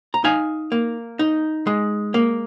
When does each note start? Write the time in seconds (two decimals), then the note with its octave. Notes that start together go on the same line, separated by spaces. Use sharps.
0.14 A#5
0.24 D#4 F5 G#5
0.72 A#3
1.19 D#4
1.67 G#3
2.14 A#3